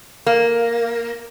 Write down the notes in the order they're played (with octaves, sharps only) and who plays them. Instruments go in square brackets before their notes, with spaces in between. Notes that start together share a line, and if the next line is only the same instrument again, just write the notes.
[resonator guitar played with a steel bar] A#3